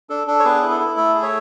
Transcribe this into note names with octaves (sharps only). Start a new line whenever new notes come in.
D4 A4
D4 A4
C#5
B3 G#4 B4
E4
A4
E4
A3 A4
G#4
C#5 E5